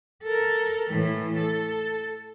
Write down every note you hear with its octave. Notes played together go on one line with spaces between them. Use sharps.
A4 A#4
A2 E3
A4